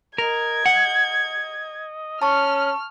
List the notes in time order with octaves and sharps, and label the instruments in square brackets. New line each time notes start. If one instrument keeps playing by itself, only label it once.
[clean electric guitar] A#4 [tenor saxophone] D#5 [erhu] G#6
[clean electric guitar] F#5
[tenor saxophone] C#4 [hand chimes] A5 C#6 [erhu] F6